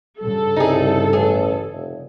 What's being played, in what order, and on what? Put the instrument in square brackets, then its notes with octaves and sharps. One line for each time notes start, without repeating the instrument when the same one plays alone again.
[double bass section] G2 C#3 [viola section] A4
[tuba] C2 [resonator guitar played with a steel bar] D#4 G#4
[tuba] A1 [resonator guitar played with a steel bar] G#4
[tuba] F1